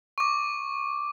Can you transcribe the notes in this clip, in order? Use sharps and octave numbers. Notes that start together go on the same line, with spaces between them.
C#6 D6